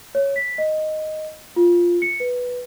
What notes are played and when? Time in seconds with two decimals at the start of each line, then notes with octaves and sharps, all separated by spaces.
0.15 C#5
0.36 B6
0.58 D#5
1.56 F4
2.02 C#7
2.20 B4